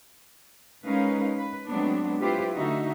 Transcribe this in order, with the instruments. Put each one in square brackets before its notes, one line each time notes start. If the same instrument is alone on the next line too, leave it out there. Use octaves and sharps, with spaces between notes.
[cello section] G#3 C#4 D#4 A#4 B4 F5
B4
F#3 G#3 A3 B3 C4 D4
E4 F4 G4 B4 C5
D3 A3 D#4 F#4 E5